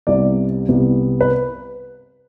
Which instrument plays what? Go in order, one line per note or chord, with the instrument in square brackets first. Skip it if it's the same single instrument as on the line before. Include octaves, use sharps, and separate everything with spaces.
[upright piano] C2 C3 G3 B3 D5
C2 C3 G3 B3
B4